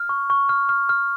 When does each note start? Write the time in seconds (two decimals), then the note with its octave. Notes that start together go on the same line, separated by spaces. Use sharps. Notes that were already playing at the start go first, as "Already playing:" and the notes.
Already playing: F6
0.09 C#6
0.30 C#6
0.49 F6
0.69 F6
0.89 F6